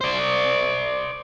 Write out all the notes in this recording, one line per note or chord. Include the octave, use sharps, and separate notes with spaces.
C5 D5